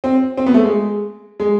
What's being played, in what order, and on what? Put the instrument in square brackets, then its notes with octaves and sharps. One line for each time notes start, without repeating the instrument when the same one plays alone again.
[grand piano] C4
C4
B3
A3
G#3
G#3